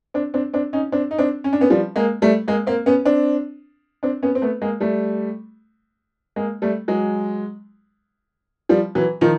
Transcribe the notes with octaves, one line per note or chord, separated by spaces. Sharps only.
C4 D4
C4 D4
C4 D4
C#4 D#4
C4 D4
D#4
C4 D4
C#4
D4
B3 C#4
F3 G3
G#3 A#3
G3 A3
G#3 A#3
A#3 C4
B3 C#4
C4 D4
C4 D4
B3 C#4
C4
A3 B3
G#3 A#3
G3 A3
G#3 A#3
G3 A3
F#3 G#3
F3 G3
E3 F#3
D#3 F3